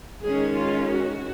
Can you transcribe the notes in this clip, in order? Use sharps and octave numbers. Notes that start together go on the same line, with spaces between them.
D#3 G#3 C#4 G#4
F4
F#4